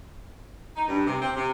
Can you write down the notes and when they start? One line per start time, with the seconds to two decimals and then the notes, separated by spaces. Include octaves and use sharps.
0.76 D#4
0.88 G2
1.07 C3
1.21 C4
1.36 C3